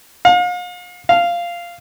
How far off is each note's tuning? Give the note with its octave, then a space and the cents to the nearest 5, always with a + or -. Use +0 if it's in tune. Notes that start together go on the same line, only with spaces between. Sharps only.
F5 +40
F5 -10